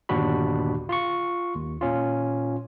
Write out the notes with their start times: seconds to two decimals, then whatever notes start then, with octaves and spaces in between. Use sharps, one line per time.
0.09 G1 D#2 A#2 D4 F#4 B5
0.89 F4 C6 C#6
1.56 D#2
1.81 A#2 C#4 F4